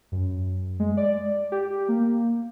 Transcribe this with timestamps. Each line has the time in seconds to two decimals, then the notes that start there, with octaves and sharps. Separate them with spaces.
0.12 F#2
0.80 G#3
0.97 D5
1.52 G4
1.88 A#3